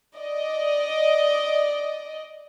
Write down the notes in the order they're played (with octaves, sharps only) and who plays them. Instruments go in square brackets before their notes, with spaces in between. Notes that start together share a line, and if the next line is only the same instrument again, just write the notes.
[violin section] D5 D#5